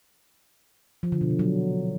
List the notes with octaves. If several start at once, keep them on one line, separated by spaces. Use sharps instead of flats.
F3
D3
B2
C3
F#3